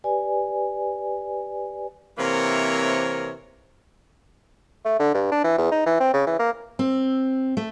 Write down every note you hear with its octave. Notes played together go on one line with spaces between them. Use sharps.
G4 B4 D5 G#5
C3 E3 A#3 C4 A#4 C#5
A3
D3
G2
D4
E3
E2
D#4
E3
C4
C#3
E3
A#3
C4
A3